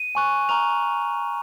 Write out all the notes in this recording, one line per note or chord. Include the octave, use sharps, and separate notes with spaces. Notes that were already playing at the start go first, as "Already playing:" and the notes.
Already playing: D#7
G#5 C#6 F#6
A#5 C#6 F6 F7